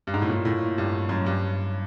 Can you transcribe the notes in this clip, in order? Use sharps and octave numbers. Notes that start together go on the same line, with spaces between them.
G2
G#2
A2
A#2
A2
G2
F#2
G2